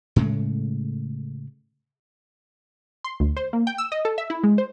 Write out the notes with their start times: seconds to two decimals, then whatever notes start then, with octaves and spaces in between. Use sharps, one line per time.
0.16 A2 C#3 G#3 A3
3.04 C6
3.20 D2
3.37 C5
3.53 A#3
3.67 G5
3.78 E6
3.92 D#5
4.05 A4
4.18 E5
4.30 E4
4.44 G#3
4.58 C5